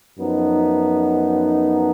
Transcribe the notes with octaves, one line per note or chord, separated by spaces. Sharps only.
F#2 F3 B3 D#4